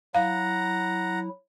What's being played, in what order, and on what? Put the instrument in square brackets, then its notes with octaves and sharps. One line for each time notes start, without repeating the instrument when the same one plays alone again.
[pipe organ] F#3 E4 [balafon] F5 [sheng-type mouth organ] F#5 A#5